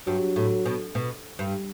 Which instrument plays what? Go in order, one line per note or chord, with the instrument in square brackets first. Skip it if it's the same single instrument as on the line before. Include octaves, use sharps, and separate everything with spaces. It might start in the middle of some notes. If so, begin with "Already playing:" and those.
[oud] G2 [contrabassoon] F#3
[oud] A2
B2
B2
G2